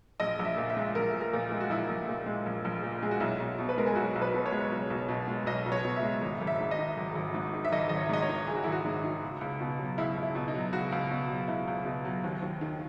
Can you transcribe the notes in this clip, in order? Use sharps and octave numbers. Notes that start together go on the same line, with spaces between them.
A#1 D#5
A#1
E5
A#2
E5
G#3
A#1 A#4
A#1
A#4
A#2
G#3
F#4
A#1 E4
A#1
A#2
G#3
A#1
A#1
A#2
G#3 G#4
F#4
B1 E4
B1
B2
B4
G#3 A#4
G#4
B1 F#4
B1
B4
B2
C#5
G#3
B1
B1
B2
G#3
B1 D#5
B1
C#5
B2
E5
G#3
G#1
G#1
E5
G#2
D#5
D#3
G#1
G#1
G#2
D#3
E5
G#1 D#5
G#1 D#5
C#5
G#2 D#5
C#5
D#3
G#1 G#4
F#4
G#1 E4
F#4
G#2
D#3
C#2
C#2
B2
F#3
C#2 E4
C#2
E4
B2
D#4
F#3
C#2 F#4
C#2
B2
F#3
C#2 E4
C#2
B2
F#3
D#2
D#2
D#3